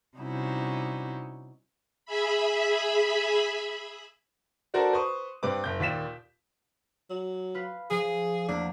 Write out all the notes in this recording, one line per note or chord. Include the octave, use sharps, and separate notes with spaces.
C3 G3 C#4 D#4 E4 F#4
G#4 E5 B5
D4 F#4 A4 A#4 C5 D5
B4 C5 C6 C#6 D#6
G2 C4 B4 D6
F#1 G6
D#2 A#2 B6 E7
F#3
F4 B4
F3 G#4
E2 A3 A#3 D4